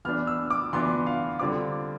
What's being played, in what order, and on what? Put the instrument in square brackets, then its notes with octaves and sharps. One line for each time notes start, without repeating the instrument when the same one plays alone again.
[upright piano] E3 B3 D4 F6
E6
D6
E3 B3 D4 C6
F5
D3 G3 C4 F4 D6